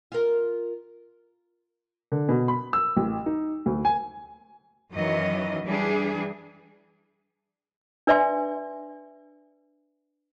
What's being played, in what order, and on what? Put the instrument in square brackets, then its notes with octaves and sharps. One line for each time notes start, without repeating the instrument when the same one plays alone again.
[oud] F4 A#4
[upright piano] D3
B2
B5
E6
A1
D#4
D2
G#5
[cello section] F#2 D#3 E3 F#3 D#5
E3 G3 D4 G#4
[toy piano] D4 B4 D5 E5 G#5 C6